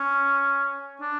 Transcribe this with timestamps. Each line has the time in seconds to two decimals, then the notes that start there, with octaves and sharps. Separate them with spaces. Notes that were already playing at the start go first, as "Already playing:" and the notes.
Already playing: C#4
1.01 D4